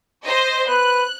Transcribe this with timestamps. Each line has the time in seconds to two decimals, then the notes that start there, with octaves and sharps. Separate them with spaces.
0.23 C5 D#5
0.69 B4 F#6